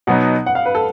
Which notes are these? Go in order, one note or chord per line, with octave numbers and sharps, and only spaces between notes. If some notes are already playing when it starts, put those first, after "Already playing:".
B2 F#3 B3 D#4 F#5
F#5
F5
B4
A4